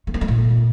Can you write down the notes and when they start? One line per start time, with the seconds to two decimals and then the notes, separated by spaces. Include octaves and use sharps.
0.07 A3
0.14 A#3
0.21 A3
0.28 A#2